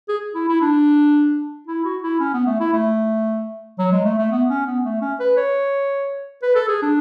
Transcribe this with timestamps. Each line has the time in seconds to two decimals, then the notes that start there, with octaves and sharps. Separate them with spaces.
0.09 G#4
0.35 E4
0.49 E4
0.61 D4
1.67 E4
1.85 F#4
2.03 E4
2.20 C#4
2.34 B3
2.47 A3
2.60 E4
2.73 A3
3.79 F#3
3.92 G#3
4.05 A3
4.18 A3
4.31 B3
4.49 C#4
4.67 B3
4.84 A3
5.01 C#4
5.20 B4
5.37 C#5
6.43 B4
6.55 A4
6.68 G#4
6.82 D4